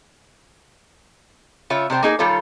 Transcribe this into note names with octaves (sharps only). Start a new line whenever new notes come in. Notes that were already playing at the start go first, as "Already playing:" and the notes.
C#3 F4 C#5 E5
C3 G3 C5 G5
A#3 D#4 G#4
D#3 G3 F4 A4 C#5